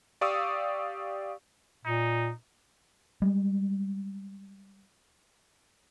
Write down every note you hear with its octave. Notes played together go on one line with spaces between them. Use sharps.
G4 D5 F5 C#6 D#6 E6
A#2 D#4
G3 G#3